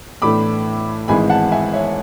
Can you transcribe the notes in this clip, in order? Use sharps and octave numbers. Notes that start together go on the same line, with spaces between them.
A2 E3 A3 D4 B5 D6
G#1 G#2 E3 G#3 G#5 B5
F#5 A5
E5 G#5
C#5 E5